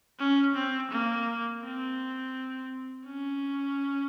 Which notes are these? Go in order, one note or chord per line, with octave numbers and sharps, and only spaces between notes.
C#4
C4
A#3
C4
C#4